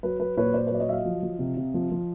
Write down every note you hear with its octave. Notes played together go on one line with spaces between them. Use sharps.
F#3 B4
F#3 B4
A#2 B4 C#5
A#2 C5 D5
F#3 B4 C#5 D5
C#5 D#5
F#3 D#5 E5 F5
F3
F3
C3
C3
F3
F3